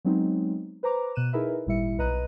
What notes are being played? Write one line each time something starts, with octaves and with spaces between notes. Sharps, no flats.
F#3 G#3 B3 C4 D#4
B4 C5 A#5 D6
B2 F#6 D#7 E7
D#4 E4 G#4 A#4 B4 E5
G#1 A#2 G3 E4 E5 C#7
B1 B4 D#5 A#5 F#6 D#7